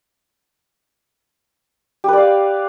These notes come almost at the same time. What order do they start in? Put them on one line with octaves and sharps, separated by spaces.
G4 B4 D5 F5